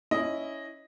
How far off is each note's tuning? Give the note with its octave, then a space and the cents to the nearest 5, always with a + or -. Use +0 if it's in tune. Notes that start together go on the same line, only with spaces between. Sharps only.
C#4 +10 E4 -10 D#5 +0